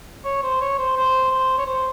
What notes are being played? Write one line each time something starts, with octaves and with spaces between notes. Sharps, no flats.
C#5
C5
C#5
C5
C5
C5
C#5
C5